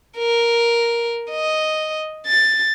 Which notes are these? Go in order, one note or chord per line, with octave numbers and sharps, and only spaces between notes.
A#4
D#5
A6